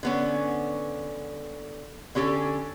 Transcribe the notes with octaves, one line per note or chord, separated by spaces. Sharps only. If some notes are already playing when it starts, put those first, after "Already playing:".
D3 B3 C#4
D3 C#4 G4 A4 G#5